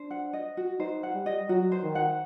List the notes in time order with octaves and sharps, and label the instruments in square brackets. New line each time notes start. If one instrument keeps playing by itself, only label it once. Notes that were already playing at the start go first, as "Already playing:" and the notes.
Already playing: [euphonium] D4 [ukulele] C5
[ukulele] F#5
D#5
F#4
[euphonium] D#4 [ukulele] C5
[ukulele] F#5
[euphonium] G3
[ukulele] D#5
[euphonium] F#3 [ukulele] F#4
[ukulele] C5
[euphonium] D#3
[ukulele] F#5